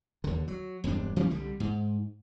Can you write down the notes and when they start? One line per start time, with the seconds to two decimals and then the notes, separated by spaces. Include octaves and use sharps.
0.24 D#2 D3
0.48 F#3
0.84 E1 G2 C3 D4
1.16 E3 G3 A#3 C#4
1.30 C2 D3 G3
1.60 G#2